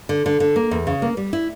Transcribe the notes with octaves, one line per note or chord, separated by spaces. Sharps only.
D3
D3
D3
A#3
E2
C#3
A#3
G3
E4